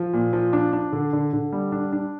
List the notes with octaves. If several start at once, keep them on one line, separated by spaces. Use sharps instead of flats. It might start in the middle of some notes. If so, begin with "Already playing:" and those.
Already playing: F3
A#2
F3
D4
D4
D3
D3
D3
G3
D4
D4